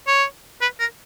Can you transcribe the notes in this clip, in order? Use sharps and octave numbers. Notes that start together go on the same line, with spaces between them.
C#5
B4
A#4